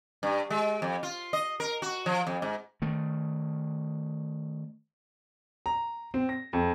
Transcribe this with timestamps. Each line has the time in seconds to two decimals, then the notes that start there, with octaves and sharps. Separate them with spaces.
0.23 G2
0.50 G#3
0.82 F2
1.03 F4
1.33 D#5
1.60 A#4
1.82 F#4
2.06 F3
2.27 F2
2.42 G#2
2.82 D#3 A3
5.66 A#5
6.14 C4
6.29 A#6
6.53 F2